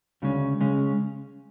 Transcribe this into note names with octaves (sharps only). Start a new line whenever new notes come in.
D2 C#3 G#3 C#4
C#3 G#3 C#4